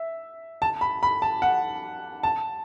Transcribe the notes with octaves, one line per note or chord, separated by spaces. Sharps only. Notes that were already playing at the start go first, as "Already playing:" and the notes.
Already playing: E5
A5
B5
B5
A5
F#5
A5